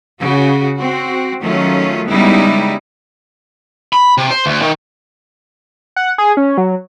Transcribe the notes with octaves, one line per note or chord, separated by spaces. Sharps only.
C#3 F#4
C4 F#4
D#3 F#3 A3 C#4 F4
C#3 G3 G#3 B3 D#4 E4
B5
C3
C5
D2
D#3
F#5
G#4
C#4
F#3